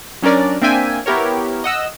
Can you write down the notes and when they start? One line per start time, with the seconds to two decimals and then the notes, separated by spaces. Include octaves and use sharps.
0.22 F#3 C#4 D4 A#4 D5
0.62 A#3 C4 D4 E5 G5 G#5
1.06 B3 E4 G4 A#4 C#5
1.64 D#5 F#5 E6